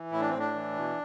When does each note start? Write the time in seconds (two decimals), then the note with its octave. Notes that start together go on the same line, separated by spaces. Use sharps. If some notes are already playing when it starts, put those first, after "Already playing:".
Already playing: E3
0.11 A2 E4
0.20 D4
0.29 A2 C4
0.40 D4
0.54 E3
0.76 B2